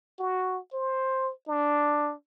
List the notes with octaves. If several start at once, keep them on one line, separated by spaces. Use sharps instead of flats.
F#4
C5
D4